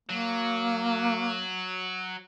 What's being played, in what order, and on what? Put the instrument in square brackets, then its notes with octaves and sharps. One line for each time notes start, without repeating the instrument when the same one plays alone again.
[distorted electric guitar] F#3 [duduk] A#3